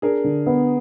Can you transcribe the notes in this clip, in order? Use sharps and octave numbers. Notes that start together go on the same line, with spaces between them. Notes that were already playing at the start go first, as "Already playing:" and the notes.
D4 G#4 A#4
D3
B3